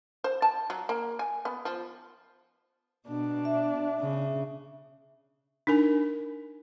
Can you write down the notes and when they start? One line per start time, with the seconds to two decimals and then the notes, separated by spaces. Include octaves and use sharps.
0.24 C5
0.42 A5
0.70 F#3
0.89 A#3
1.19 G#5
1.45 B3
1.65 F3
3.08 B2 D4
3.45 E5
4.00 C#3
5.67 D4 D#4 A#4 G#5